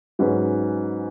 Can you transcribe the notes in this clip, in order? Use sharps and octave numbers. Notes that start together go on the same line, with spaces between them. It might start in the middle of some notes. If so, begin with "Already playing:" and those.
G#2 F#3 C#4 G#4 B4